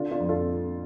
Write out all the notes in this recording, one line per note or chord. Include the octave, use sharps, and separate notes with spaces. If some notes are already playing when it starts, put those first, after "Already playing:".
Already playing: D3 D4 F4
D4 F4
F2
F4 A4